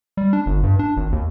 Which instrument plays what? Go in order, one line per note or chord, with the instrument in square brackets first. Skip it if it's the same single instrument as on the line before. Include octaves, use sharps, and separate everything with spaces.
[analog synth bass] G3
D4
G1
G2
D4
G#1
D#2